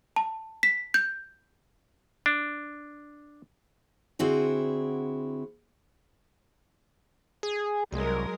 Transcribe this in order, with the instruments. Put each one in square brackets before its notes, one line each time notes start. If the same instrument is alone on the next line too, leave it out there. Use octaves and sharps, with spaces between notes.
[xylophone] A5
B6
G6
[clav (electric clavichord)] D4
[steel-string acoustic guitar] D3 C4 E4 F#4 G#4
[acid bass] G#4
[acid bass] C2 [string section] F#3 G#3 A#4